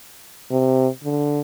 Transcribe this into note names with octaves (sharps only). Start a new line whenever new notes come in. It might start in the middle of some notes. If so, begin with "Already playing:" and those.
C3
D3